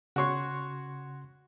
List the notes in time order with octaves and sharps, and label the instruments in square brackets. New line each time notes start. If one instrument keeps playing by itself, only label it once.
[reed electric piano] C#3 C6 [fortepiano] F#4 C#5